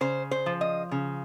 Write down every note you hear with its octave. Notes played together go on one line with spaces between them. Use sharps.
C#3 C5
C5
F3
D#5
C#3